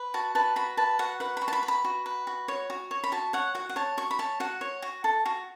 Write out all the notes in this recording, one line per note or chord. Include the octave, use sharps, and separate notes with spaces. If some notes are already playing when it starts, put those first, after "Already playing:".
Already playing: B4
F#4 A5
B4 A5
F#4 B5
B4 A5
F#4 F#5
B4 F#5
F#4 B5
A5
B5
B4
B5
F#4
B4
F#4
C#5
F#4
C#5
B5
F#4 A5
C#5 F#5
F#4 F#5
F#5
C#5 A5
F#4 C#6
B5
C#5 A5
F#4 F#5
C#5
F#4
A4
F#4